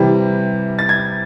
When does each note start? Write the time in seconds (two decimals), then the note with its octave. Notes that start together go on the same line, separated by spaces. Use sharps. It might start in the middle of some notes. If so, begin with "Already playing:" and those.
Already playing: C3 E3 G3
0.79 A6
0.89 G#6